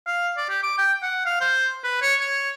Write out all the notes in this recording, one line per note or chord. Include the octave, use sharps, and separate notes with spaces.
F5
D5
G4
D6
G5
F#5
F5
C5
B4
C#5
C#5